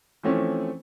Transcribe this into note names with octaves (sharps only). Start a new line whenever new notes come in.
E3 F3 A3 C4 C#4